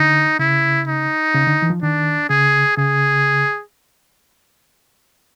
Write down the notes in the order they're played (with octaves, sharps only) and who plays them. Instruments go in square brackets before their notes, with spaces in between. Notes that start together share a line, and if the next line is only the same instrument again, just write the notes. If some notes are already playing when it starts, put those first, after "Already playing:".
Already playing: [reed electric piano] D3 [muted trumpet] D#4
[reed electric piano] C#3 [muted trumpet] E4
[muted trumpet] D#4
[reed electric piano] C#3
D3
E3
F3
[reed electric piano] D#3 [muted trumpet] D4
[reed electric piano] C#3 [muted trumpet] G#4
[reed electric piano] C#3 [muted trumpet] G#4